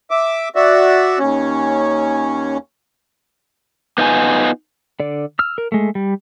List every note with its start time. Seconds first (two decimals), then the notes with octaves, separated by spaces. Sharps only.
0.11 E5 D6
0.56 F#4 D5 E5
1.19 D#2 C#4
3.98 B3 D#4 F4 G#5
5.00 D3 D5
5.39 E6 F6
5.58 A#4
5.72 G#3 A3
5.95 G3